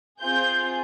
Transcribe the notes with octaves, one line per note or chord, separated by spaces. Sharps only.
C4 F4 G#4 G6